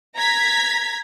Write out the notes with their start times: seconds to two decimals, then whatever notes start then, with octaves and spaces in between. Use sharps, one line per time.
0.15 A#5 G#6 B6